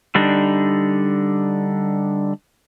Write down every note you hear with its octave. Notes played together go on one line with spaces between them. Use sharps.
D3 G3 D4 D#4